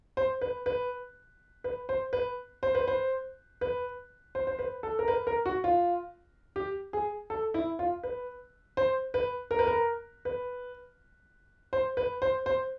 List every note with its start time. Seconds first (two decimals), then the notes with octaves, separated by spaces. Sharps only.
0.17 C5
0.41 B4
0.66 B4
1.64 B4
1.89 C5
2.13 B4
2.63 C5
2.75 B4
2.88 C5
3.61 B4
4.35 C5
4.47 C5
4.59 B4
4.83 A4
4.99 A#4
5.08 B4
5.27 A#4
5.46 F#4
5.64 F4
6.56 G4
6.93 G#4
7.30 A4
7.54 E4
7.79 F4
8.03 B4
8.77 C5
9.14 B4
9.51 A#4
9.59 B4
9.67 A#4
10.25 B4
11.73 C5
11.97 B4
12.22 C5
12.46 C5